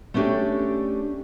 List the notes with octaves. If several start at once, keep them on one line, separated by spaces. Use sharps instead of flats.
A3 B3 C#4 D4 G4 A4